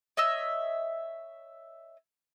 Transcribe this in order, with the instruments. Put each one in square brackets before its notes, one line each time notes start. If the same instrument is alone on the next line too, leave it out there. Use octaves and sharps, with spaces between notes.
[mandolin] C#5 D#5 E5 E6